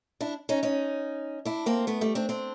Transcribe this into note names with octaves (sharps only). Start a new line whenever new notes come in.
D4 E4
C#4 D#4
C#4 D#4
D4 E4
A#3 C4
A3 B3
G3 A3
C4 D4
C4 D4